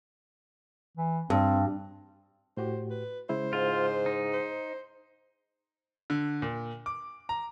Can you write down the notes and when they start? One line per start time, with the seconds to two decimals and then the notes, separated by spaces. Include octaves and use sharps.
0.98 E3
1.30 G2 C4
2.57 A2 F#4 G4 C5
2.90 B4
3.29 C#3 G#3 E4 C5
3.53 G#2 F4
4.06 D#4
4.33 C5
6.10 D3
6.42 A#2
6.86 D6
7.29 A#5